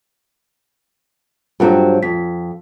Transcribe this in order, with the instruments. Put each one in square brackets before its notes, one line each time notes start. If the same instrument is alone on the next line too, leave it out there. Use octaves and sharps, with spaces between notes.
[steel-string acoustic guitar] G2 F#3 C4 [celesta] F4 A4 A#5
[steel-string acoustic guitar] F2 [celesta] B6